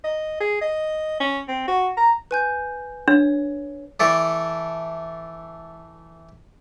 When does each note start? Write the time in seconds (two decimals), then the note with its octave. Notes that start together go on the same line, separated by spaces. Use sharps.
0.04 D#5
0.40 G#4
0.61 D#5
1.20 C#4
1.48 C4
1.68 F#4
1.97 A#5
2.31 B4 G#5 G6
3.08 D4 C#5
4.00 E3 A3 A4 D5